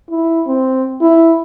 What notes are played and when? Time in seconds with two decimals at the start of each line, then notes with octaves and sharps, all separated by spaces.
0.10 E4
0.47 C4
1.01 E4